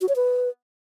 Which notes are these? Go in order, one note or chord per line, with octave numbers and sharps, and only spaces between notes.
F#4
C#5
B4